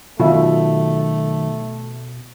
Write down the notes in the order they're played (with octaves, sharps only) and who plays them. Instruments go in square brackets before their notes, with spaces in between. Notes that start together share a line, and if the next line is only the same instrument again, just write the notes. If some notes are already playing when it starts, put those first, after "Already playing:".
[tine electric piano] B2 [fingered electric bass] D#3 F#3 [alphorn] A3 [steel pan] F4 E5